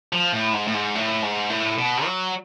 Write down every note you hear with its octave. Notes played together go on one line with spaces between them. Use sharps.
F3
A2
G#2
A2
G#2
A2
G#2
A2
B2
F#3